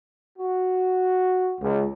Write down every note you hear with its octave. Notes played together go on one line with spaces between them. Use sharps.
F#4
C#2